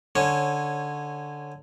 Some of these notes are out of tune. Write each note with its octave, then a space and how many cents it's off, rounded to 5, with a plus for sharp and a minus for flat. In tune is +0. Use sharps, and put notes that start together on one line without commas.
D3 +0 C#4 -10 C#5 -20